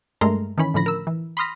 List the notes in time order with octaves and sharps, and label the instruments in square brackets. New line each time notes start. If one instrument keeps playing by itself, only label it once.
[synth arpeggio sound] G2 G#3 A3 A#4 A#5 C6
D#3 E3 C#4 B5
A2 D3 F3 B5 A#6
A#4 E6
E3
B5 C6 D#6 F6 A#6 B6